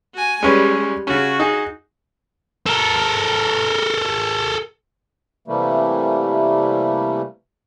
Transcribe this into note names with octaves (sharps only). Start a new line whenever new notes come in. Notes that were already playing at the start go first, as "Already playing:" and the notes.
F#4 G#5
G3 G#3 C#4 B4
C#3 C#4 F#4
D#4 G#4 G#5
A4 A#4
C3 E3 G3 A3 A#3